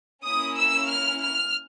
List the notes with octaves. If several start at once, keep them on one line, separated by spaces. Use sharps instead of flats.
A#3 C#4 E4 D#6
E6
F6
F6